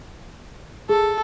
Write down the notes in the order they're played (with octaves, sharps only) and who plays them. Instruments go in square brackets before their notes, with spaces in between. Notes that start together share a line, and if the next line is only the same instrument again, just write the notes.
[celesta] G#4 [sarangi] A4